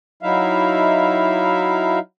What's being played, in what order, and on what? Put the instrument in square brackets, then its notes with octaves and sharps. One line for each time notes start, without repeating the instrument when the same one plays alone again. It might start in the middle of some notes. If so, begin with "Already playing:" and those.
[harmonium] F#3 D#4 E4 E5 F5